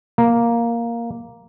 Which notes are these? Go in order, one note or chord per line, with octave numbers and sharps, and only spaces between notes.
A#3